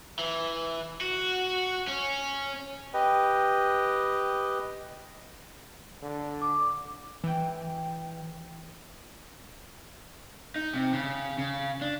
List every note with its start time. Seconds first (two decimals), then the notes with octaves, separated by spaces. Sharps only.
0.19 E3
1.01 F#4
1.87 C#4
2.94 G4 B4 D#5 G5
6.02 D3
6.42 D6
7.24 E3 G5
10.56 D#4
10.73 C3
10.94 C#3
11.39 C#3
11.81 D4